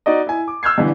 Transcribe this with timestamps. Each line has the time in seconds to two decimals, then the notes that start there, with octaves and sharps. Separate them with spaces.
0.06 D#4 F#4 D5 D#5
0.27 E4 G#5
0.48 D6
0.63 E6 F6 G6 G#6 C7
0.78 G2 D3 E3